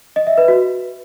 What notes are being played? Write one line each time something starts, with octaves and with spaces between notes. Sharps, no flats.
D#5
E5
B4
F#4